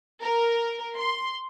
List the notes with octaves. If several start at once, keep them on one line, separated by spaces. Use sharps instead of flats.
A#4
C6